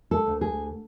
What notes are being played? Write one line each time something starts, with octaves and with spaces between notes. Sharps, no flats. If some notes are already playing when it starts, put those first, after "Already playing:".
A4
D2
G#4